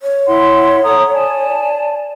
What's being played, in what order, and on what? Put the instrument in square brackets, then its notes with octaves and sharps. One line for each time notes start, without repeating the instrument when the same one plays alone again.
[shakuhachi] C#5
[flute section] E4 F#5 C6
A4 A#5 D#6
D5 G#5 A5